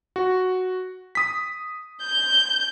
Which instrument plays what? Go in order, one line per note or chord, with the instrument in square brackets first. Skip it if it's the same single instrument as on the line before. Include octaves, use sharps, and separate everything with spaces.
[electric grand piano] F#4
D#6 B6
[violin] G6